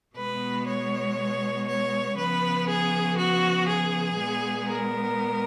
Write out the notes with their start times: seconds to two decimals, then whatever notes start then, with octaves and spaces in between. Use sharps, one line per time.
0.17 B2 G#3 B3 B4
0.67 C#5
1.67 C#5
2.17 C#3 F3 B3 B4
2.68 G#4
3.17 F#4
3.68 G#4
4.18 A#2 G#3 B3
4.67 A#4